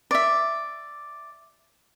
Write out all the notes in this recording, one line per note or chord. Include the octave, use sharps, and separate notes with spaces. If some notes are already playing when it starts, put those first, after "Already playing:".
D5 E5